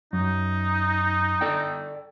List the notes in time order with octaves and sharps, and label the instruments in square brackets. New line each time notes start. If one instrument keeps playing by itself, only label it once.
[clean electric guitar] F#2 [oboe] D#4
[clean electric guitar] A4 D5 G5